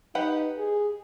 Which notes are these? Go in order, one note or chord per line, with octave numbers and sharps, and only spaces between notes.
D#4 G4 B4 F#5
G#4